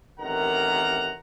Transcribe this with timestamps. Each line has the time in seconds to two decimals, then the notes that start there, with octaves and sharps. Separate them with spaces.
0.19 A1 C3 D#3 A#4 F#5 A#5